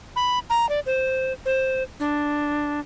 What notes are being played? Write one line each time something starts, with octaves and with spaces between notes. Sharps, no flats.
B5
A#5
D5
C5
C5
D4